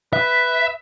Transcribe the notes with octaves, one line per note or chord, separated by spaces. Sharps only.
B4 E5